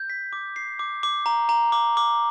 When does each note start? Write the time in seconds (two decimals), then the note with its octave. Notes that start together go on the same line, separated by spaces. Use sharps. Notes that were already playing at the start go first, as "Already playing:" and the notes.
Already playing: G6
0.10 B6
0.33 D6
0.56 C7
0.79 D6
1.03 D6
1.26 A#5
1.49 A#5
1.72 D6
1.97 D6